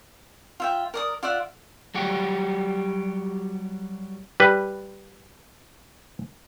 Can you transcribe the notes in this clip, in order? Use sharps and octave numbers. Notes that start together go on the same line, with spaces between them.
F4 E5 G5
A#4 D5 D#6
F4 D5 E5 F#5
F#3 G3 F#4 G4
G3 B4